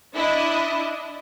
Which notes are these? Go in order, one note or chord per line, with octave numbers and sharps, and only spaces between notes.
D4 E4 D#5